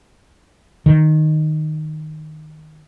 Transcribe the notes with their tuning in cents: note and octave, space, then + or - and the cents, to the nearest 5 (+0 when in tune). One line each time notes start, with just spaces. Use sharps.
D#3 -10